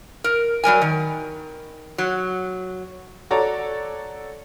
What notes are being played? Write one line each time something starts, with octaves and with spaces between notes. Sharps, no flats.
A#4
F#3 G3 A#4 G#5
D#3
F#3
F#4 A4 C#5 D5 A#5